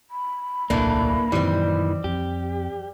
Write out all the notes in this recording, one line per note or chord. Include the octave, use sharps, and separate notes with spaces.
B5
D1 B1 A#2 E3 A3 A#3 D4
F#2 A#2 D#3 E3 G3 C4
F2 G4